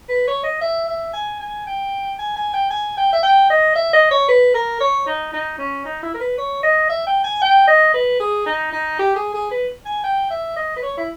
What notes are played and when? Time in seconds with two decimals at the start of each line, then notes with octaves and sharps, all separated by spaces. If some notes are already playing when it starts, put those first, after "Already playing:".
0.09 B4
0.27 C#5
0.44 D#5
0.61 E5
0.88 E5
1.13 G#5
1.40 G#5
1.67 G5
2.19 G#5
2.36 G#5
2.54 G5
2.71 G#5
2.97 G5
3.13 E5
3.23 G5
3.50 D#5
3.75 E5
3.93 D#5
4.11 C#5
4.29 B4
4.54 A#4
4.80 C#5
5.07 D#4
5.33 D#4
5.58 C#4
5.85 D#4
6.03 E4
6.14 A#4
6.20 B4
6.38 C#5
6.63 D#5
6.89 E5
7.07 G5
7.24 G#5
7.42 G5
7.68 D#5
7.94 B4
8.20 G#4
8.46 D#4
8.72 D#4
8.99 G4
9.16 G#4
9.34 G#4
9.51 B4
9.86 G#5
10.04 G5
10.30 E5
10.56 D#5
10.76 B4
10.83 C#5
10.98 E4